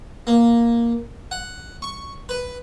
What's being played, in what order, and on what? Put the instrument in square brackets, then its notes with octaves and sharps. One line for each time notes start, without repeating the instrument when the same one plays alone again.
[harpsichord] A#3
F#5
C#6
B4